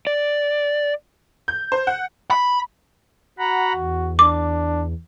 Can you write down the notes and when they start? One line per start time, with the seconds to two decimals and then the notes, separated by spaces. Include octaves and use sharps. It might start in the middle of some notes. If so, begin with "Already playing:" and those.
0.07 D5
1.48 G6
1.72 C5
1.87 F#5
2.31 B5
3.39 F#4 F#5 A#5 B5
3.75 E2
4.19 D4 D6